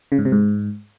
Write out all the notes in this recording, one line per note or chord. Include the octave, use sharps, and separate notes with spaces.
C#3
G#2
C3
G#2